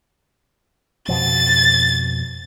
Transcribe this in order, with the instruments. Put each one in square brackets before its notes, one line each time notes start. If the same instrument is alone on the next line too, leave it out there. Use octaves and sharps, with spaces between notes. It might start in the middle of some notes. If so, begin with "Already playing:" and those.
[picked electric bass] F2 B2 F3 [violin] A6